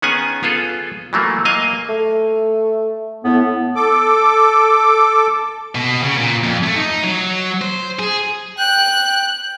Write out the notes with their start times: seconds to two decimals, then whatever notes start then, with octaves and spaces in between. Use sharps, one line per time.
0.02 D#3 B3 C#4 G#4 F#5 G#5
0.43 B3 F4 G#4 A4
1.13 E3 F#3 A3 A#3
1.45 A#3 D#5 F5 G#5
1.89 A3
3.25 A2 B3
3.76 A4 D6
5.75 B2
6.03 C#3
6.18 A#2
6.44 F2
6.64 A3
6.76 D#4
7.04 F#3
7.62 C5
7.99 G#4
8.59 G5 F#6